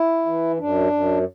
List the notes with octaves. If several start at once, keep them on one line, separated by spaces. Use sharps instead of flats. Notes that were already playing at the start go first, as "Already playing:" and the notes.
Already playing: E4
E3
F#2 D4
F#2